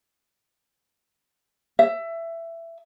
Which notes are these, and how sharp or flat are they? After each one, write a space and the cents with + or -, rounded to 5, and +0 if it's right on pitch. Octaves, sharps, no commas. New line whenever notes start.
E5 +15